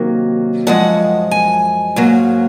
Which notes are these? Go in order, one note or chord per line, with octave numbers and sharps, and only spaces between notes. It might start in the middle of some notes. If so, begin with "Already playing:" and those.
Already playing: C3 D#3 F#3 A#3
F#2 F3 G#3 F#5
G#5
G#2 F#3 A#3